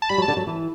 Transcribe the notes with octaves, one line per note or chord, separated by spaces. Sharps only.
A5
G3 B5
F#3 A5
D3
F#3
E3